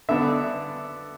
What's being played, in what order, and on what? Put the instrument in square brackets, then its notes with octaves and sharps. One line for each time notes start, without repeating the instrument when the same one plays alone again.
[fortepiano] D3 B3 D4 E5